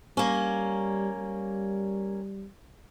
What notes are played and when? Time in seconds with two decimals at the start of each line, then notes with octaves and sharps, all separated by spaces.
0.17 G3 A#3 C#4
1.17 G3